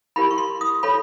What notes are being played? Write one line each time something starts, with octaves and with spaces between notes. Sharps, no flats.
E4 G4 A#4 B5
C#6
C6
D#6
F4 A4 C#5 B5